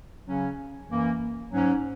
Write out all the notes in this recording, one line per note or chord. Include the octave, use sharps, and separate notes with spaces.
C#3 F#3 C#4
F#2 E3 A#3
G#2 F#3 C#4